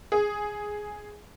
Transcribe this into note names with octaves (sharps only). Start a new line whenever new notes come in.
G#4